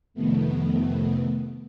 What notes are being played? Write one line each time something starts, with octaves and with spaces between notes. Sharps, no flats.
F2 C3 D#3 A3 B3